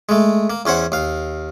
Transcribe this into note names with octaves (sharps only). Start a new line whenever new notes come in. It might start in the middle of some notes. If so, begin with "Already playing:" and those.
G#3 A3
A#3
E2 C#4 C5 F#5
D#2 F5